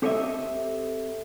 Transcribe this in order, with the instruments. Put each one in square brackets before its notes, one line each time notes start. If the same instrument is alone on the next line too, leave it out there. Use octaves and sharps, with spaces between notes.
[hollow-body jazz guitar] C4 G4 A4 C#5 D#5 E5